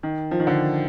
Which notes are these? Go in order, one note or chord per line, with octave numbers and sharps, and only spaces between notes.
D#3
F3
D#3
D3